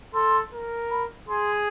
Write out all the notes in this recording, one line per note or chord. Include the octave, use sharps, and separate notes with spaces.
A4 C6
A#4
B5
G#4 C6